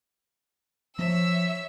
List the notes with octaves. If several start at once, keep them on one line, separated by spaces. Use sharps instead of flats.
F3 C#5 E5 E6